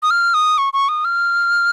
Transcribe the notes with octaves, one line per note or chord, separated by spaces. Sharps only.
D#6
F6
D#6
C#6
C#6
D#6
F6